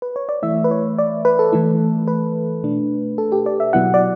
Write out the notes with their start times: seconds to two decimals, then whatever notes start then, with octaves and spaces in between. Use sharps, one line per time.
0.02 B4
0.16 C#5
0.29 D5
0.43 E3 A3 E4 E5
0.64 B4
0.71 C#5
0.98 D5
1.25 B4
1.39 A4
1.52 E3 A3 E4
2.08 B4
2.63 B2 A3 D4
3.18 A4
3.32 G4
3.46 D5
3.60 E5
3.73 B2 F#3 B3 E4 F#5
3.94 D5